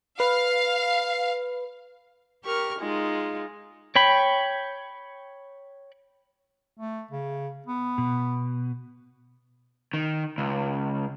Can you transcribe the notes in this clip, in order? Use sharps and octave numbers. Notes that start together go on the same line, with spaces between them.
B4 F5
G4 A#4 C#6 F6
G#3 D#4 F4
C#5 G5 B5
A3
C#3
B3
B2
D#3
C#2